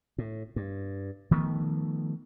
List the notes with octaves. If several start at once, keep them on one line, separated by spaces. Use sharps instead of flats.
A2
G2
D#3 F3 A3 B3